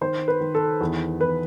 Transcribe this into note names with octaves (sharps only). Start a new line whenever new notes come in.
D#3 C5
B4
D#3
A4
E2
E2 B4